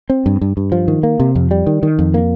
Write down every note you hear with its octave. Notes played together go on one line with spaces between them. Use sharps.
C4
G2
G2
G2
F3
D#3
A#3
C3
F2
G3
D#3
D#3
F2
A#3